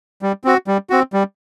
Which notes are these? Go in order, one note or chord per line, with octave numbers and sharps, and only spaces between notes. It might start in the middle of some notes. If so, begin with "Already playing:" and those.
G3
C4 F#4
G3
C4 F#4
G3